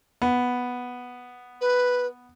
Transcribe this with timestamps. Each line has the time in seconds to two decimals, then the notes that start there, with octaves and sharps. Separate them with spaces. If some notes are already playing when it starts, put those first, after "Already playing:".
0.22 B3
1.60 B4